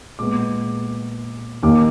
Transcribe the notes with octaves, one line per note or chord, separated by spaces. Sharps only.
A#2 G#3 B3 D6
D#2 D#3 A#3 D6